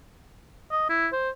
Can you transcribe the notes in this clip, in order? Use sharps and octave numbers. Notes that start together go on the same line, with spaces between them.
D#5
E4
C5